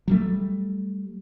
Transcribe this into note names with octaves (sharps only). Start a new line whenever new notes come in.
F#3 G3 A3